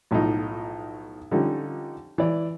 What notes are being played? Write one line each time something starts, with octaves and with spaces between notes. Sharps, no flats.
B1 A2 F3 D#4
D3 F3 G3 C#4 D#4
E3 D5